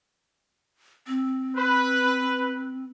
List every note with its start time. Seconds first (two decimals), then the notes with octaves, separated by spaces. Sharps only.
1.07 C4
1.57 B4